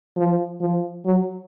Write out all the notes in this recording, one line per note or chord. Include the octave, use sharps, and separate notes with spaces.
F3
F3
F#3